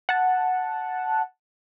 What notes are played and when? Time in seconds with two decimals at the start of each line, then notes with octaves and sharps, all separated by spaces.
0.09 F#5 A5